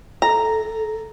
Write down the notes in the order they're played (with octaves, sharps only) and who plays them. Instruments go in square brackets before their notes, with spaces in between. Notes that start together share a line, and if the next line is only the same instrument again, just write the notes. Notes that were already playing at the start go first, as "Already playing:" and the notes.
[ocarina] A4 [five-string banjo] A#5